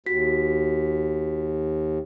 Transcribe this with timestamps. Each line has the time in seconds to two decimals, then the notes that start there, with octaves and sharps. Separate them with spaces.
0.06 D#2 F#4 B6